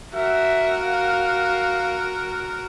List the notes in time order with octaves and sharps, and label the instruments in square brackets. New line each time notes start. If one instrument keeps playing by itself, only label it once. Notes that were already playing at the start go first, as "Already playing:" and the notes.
[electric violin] F#4 A#4 [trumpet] E5
[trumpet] F5